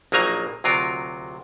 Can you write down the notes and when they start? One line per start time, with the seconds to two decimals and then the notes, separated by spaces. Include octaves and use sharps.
0.12 A#1 D#3 F#3 A#3 G#5 A#5
0.64 D2 C3 F#3 F4 A#4